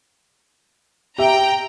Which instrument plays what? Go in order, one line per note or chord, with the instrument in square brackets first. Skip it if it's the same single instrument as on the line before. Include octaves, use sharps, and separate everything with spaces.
[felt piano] G4 E5 [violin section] G5 A#5